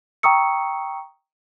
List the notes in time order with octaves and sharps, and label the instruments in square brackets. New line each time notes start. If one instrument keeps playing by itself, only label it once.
[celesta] G5 A#5 C#6 D#6 E6 C#7